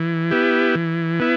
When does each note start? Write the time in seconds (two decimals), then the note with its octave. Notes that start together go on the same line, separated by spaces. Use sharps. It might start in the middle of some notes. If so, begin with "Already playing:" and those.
Already playing: E3
0.31 B3 E4 G4
0.75 E3
1.20 B3 E4